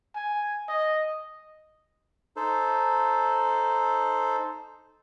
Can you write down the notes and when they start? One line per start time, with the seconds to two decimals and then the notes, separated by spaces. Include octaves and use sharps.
0.15 G#5
0.68 D#5
2.36 D#4 A4 C5